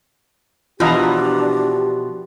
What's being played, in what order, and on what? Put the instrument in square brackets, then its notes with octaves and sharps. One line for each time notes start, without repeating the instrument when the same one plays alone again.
[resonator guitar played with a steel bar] B2 E3 F3 [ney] D4 [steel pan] F4 D#5 A#5 [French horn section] G4